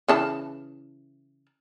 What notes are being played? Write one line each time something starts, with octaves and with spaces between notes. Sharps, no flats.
C#3 E3 A5